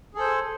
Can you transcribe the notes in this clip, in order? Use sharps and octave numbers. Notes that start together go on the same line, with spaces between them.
G#4 A4 C5